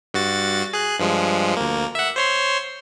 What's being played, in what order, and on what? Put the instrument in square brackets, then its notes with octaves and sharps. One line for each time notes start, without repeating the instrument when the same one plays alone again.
[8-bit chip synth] G2 F#4 A6
G#4 F#6
G2 F3 G#3
D2 A#3
E5 F#5
C5 C#5 C6